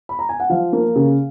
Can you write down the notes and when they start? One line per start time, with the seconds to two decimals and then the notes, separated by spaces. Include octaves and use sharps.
0.09 B5
0.19 A#5
0.29 G#5
0.40 F#5
0.50 F3 F5
0.73 A#3
0.96 C#3